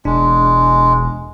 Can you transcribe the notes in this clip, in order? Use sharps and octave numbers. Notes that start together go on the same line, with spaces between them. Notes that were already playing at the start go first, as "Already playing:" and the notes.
E1 G#3 D4